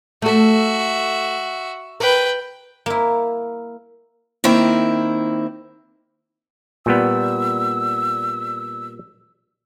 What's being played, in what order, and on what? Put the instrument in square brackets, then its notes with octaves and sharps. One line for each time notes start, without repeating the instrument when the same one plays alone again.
[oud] A3 A4 [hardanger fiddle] F#4 E5
[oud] A#4 [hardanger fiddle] B4 G5
[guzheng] A#3 E4
[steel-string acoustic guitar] D#3 A#3 C4 E4
[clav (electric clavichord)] A#2 G3 B3 [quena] E6